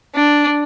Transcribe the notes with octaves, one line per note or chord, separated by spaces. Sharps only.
D4